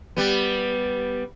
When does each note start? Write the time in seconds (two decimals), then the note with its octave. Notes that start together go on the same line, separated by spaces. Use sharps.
0.17 G3 B3